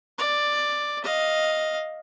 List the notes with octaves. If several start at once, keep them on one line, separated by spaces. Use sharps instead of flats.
D5
D#5 F5